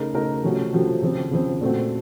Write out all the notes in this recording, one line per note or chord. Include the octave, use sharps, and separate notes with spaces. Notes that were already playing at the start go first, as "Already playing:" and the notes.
Already playing: C#3 A3 D#4 A#4
C#3 A3 D#4 A#4
C3 F3 A3 C#4 F#4
C3 F3 A3 C#4 F#4
C#3 F3 C4
C#3 F3 C4
A#2 A3 C4 F#4